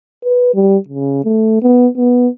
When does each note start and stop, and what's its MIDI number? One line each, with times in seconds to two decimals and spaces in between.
0.24 0.50 71
0.54 0.77 55
0.88 1.23 49
1.24 1.62 57
1.62 1.87 59
1.97 2.28 59